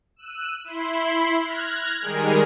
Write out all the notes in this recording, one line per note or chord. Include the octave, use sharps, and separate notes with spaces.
E6 F#6 D#7
E4 B5 C6
F6 F#6 G#6 A#6
D#3 G3 G#3 G#4 A#4